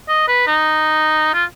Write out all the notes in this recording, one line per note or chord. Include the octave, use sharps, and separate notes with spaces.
D#5
B4
D#4
F4